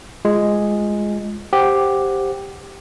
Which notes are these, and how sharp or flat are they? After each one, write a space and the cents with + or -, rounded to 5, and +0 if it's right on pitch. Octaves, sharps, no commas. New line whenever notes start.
G#3 +0 F4 +0
G4 +0 C5 +5 F#5 +0